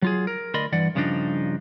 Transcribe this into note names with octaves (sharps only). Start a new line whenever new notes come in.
F#3 F4 G#4
A#4
D2 A#4 D5 D#5 B5 C6
G2 E3 D5 F#5
G2 C#3 F3 G3 D4 D#4